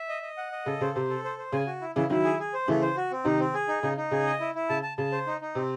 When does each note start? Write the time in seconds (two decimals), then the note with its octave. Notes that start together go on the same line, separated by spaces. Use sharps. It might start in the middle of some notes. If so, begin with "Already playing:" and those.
Already playing: E5
0.09 D#5
0.23 D#5
0.37 F#5
0.52 D#5
0.66 C#3 A4
0.81 C#3 C5
0.95 C3 C5
1.10 A4
1.24 C5
1.38 C5
1.52 C#3 G#5
1.66 F#4
1.81 E4
1.95 C#3 E3 E4
2.10 D#3 F#3 E4
2.24 G#4
2.39 G#4
2.54 C5
2.68 C#3 E3 A3
2.81 C5
2.96 F#4
3.11 C4
3.25 C3 D#3 D#4
3.39 C4
3.54 G#4
3.68 D#4
3.83 C#3 D#4
3.97 D#4
4.11 C#3 G#4
4.26 D#5
4.40 E4
4.55 E4
4.69 C#3 A5
4.83 A5
4.97 C#3 A5
5.12 C5
5.27 D#4
5.41 D#4
5.55 C3 C4